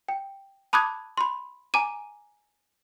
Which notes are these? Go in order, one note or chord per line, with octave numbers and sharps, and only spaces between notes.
G5
A5 B5 D6 D#6 F#6 G#6
B5 C6
G#5 A#5 D6 D#7